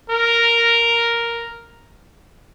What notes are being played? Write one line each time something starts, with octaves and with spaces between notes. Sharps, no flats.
A#4